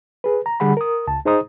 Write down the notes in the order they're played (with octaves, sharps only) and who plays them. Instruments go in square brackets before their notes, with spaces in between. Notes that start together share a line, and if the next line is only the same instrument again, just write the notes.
[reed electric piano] G#4 B4
A#5
D3 G3 G#4 F#5 B5
A#4 D#6
C#2 A5
D#4 G#4 C5 D#5 A#5 D#6